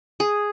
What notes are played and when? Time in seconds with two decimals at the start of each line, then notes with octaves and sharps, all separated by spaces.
0.20 G#4